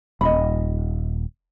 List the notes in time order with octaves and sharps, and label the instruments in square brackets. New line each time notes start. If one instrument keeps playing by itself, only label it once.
[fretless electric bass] D#1 [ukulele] D#5 B5